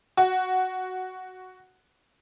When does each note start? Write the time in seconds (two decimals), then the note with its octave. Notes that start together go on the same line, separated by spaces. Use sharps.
0.17 F#4